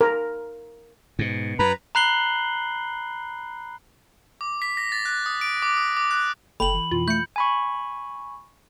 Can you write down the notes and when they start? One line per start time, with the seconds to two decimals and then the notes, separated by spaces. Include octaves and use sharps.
0.01 A#4
1.19 G#2 B2
1.59 F#2 B4 A#5 B5
1.95 A#5 B5 F#6 C7 F#7 G7
4.41 D6
4.62 B6
4.77 A#6
4.92 A6
5.05 F#6
5.26 D#6
5.41 D7
5.62 D6
5.77 D#6
5.97 D6
6.11 F#6
6.60 F#1 A4 G5 B5 F#7
6.74 E3
6.91 F2 B2 E3 F4
7.08 A3 F4 G6 C#7
7.36 G#5 B5 C#6